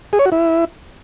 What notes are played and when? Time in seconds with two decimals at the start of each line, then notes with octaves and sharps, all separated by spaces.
0.13 G#4
0.19 C#5
0.25 F#4
0.32 E4